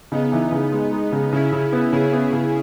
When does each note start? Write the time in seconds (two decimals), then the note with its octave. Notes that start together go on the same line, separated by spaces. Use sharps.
0.12 C#3 B3 D#4
0.32 E3
0.52 C#3
0.72 G#3
0.91 G#3
1.12 C#3
1.32 C#3 C#4 E4
1.52 C#3
1.72 B3
1.92 C#3 E4 G#4
2.13 B3
2.33 C#3